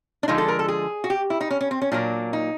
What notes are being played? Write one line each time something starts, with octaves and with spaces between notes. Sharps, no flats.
D4
D3 F3 G#3 D#4
A4
A#4
A4
G#4
F#4
G4
E4
D#4
C#4
C#4
C4
C#4
A#2 F#3 A#3 D4
D#4